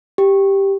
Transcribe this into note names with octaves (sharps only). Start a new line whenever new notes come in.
G4